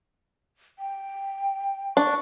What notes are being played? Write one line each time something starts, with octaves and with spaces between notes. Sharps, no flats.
G5
D4 C#6